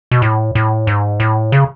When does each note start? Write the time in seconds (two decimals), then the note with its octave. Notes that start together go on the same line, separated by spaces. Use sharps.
0.11 B2
0.22 A2
0.55 A2
0.87 G#2
1.20 A2
1.52 C#3